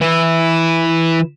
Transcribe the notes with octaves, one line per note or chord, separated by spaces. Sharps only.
E3 E4